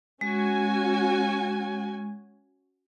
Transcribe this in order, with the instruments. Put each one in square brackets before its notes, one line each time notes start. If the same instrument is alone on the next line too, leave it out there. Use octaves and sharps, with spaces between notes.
[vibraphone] G#3 [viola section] C#4 F#4 G#5